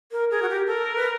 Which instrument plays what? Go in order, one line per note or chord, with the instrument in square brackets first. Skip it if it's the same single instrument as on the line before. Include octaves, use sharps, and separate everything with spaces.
[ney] A#4
[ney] G#4 [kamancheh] A#4
[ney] F#4
G4
[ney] A4 [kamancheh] A#4
[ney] B4